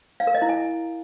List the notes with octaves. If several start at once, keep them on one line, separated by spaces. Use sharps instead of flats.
F5
A#4
D#5
E4
G#5